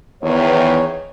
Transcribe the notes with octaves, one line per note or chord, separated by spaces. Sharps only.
E2 D#3 C#5